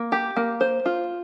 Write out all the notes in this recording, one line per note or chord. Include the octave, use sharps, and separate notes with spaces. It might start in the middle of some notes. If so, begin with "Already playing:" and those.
Already playing: A#3
G4
A#3
C5
F4